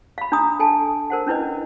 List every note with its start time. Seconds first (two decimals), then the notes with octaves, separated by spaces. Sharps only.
0.18 F5 B5
0.32 D4 A#5 D#6
0.59 A4 G#5 A5
1.10 A#4 C5 F#5
1.27 C#4 D4 E4 B4 D#5